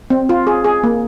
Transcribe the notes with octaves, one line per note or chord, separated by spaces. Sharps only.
C4
F4
G#4
G#4
A#3